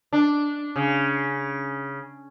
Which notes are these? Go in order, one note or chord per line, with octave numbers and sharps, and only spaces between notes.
D4
C#3